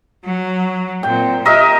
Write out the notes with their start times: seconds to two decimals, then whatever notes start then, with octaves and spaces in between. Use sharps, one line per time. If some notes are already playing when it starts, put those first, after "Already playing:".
0.24 F#3
1.03 A#2 C4 G5
1.45 G4 A#4 D#5 E5